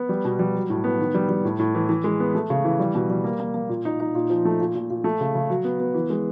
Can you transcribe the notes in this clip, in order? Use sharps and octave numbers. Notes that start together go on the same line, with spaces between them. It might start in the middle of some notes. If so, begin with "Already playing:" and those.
Already playing: B3
G3
B2
G3
F#3
A2
B3
D#3
G3
G3
A2
A2
E3
E3
G#3
B3
A3
C#3
E3
G3
B2
G3
A#3
A#3
A#3
A#2
D#4
D#4
A#2
F3
A3
A#2
A#2
A#2
A3
C#3
C#3
F#3
B3
B3
E3
G#3